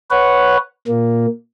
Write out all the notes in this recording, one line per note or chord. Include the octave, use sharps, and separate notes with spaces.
B4 C#5 F#5
A#2 A#3